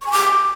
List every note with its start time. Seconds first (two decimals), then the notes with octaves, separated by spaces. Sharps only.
0.01 C#6
0.06 G#5
0.11 D6